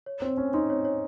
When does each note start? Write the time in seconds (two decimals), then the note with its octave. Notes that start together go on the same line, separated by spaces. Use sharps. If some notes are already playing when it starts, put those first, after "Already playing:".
0.06 C#5
0.22 C4 C#5
0.37 C#4 G#5
0.54 D#4 C6
0.70 C#5
0.85 C#5